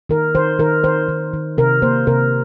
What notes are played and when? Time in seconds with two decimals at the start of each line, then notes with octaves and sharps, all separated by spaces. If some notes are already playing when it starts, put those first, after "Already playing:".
0.09 D#3 A#4
0.35 D#3 C5
0.59 D#3 A#4
0.84 D#3 C5
1.09 D#3
1.33 D#3
1.58 C3 A#4
1.82 A#3 C5
2.07 C3 A#4